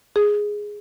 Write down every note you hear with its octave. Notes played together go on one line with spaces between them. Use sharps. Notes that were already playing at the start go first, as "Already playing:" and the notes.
G#4